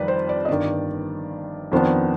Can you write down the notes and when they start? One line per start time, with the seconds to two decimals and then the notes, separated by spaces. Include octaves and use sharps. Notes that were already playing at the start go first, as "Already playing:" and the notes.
Already playing: F2 D#3 G3 B4 D5
0.08 C5
0.29 D5
0.45 D#5
0.49 G1 G2 D#3 D5
1.72 F2 D#3 B3 D4 C5